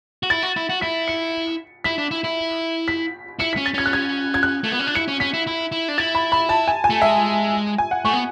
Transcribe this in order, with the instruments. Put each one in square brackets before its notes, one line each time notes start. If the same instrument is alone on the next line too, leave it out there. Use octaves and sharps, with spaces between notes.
[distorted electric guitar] F#4
[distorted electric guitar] E4 [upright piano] A6
[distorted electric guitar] F#4
E4
F#4
[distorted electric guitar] E4 [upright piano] B6
[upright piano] C#7
[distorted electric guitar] E4 [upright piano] B6
[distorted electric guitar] D4
E4
E4
[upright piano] B6
[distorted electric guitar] E4 [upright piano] C#7
[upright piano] B6
[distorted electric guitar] C#4
[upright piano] A6
[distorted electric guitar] C#4 [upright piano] G#6
[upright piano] F#6
G#6
G#6
F#6
[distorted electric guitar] A3
B3
C#4
D4
[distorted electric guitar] E4 [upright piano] C#7
[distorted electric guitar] C#4
[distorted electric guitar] C#4 [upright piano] B6
[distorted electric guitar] E4
E4
E4
D4
[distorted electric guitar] E4 [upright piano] A6
[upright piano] B5
B5
A5
G#5
G#5
[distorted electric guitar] A3
[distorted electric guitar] G#3 [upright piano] E5
[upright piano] G#5
F#5
[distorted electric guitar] A3 [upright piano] C#6
[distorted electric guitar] B3